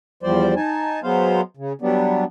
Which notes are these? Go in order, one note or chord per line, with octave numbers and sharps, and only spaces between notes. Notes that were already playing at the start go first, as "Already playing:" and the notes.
E2 F3 G3 C5 D5
D#4 G#5 A5
F#3 G#3 B3 C5 F5
C#3
F#3 G3 B3 D4